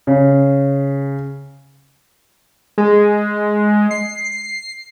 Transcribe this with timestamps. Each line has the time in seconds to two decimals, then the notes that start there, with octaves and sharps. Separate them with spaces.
0.07 C#3
2.78 G#3
3.91 C7